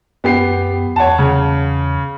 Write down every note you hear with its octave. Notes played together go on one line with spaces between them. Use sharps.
F#2 B3 G4 C7
E2 C#5 F#5 A5
C#3